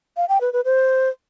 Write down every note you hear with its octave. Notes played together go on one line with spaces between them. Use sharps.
F5
G5
B4
B4
C5